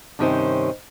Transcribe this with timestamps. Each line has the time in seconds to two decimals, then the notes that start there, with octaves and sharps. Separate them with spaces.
0.19 G2 C3 D#3 C#4 G#4 C5